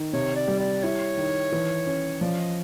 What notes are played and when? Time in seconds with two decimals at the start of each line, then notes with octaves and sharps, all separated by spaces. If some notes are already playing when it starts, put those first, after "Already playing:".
Already playing: D#3
0.13 C3 C#5
0.36 D5
0.48 G3
0.60 D5
0.83 E4 C#5
1.17 D#3
1.52 E3
1.87 C#4
2.21 F3 D5
2.39 D#5